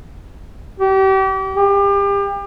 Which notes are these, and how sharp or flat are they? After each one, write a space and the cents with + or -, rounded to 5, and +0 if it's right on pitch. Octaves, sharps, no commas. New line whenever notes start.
G4 -35
G4 +30